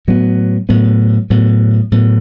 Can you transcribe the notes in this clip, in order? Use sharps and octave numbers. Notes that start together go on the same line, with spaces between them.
A2 F#3 B3
A2 F#3 B3
A2 F#3 B3
A2 F#3 B3